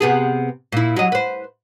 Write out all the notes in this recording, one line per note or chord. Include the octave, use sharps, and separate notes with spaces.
C3 B3 G#4
A#2 E4
F#3 D#5
B4 C5